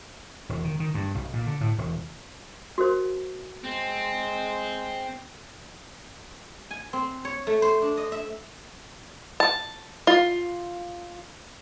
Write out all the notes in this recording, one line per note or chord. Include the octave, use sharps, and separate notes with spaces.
E1
D#3
D#3
G2
B1
A#2
D3
A2
E1
F#4 A#4 C5
G#3 C4
G#5
C4
C#5
A3
C5
D4
D#5
E5
A5
F4